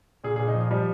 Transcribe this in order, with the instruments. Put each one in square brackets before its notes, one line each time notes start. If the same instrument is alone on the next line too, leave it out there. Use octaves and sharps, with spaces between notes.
[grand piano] A#2 G#4
A#2 G#4
D#4
F3
F3 G3